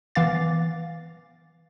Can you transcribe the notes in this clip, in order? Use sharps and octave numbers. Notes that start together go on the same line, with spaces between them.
E3 B3 F5 D6 A6